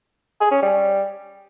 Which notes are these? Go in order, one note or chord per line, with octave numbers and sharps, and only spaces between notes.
G#4
C#4
G3